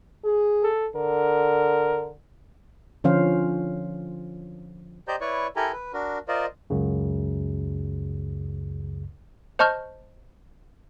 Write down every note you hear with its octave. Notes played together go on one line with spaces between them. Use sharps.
G#4
A4
D3 A#4
D3 F3 C#4 C5 F5
G4 C5 D5 D#5 A#5 G6
E4 B4 C#5 D5 C#6
E4 G4 A4 A#4 G#5 A#5
B4
D4 F#4 A#4
F4 A#4 C5 D5 D#5
C#2 F#2 C#3
C5 D#5 A5 C#6 F6 G6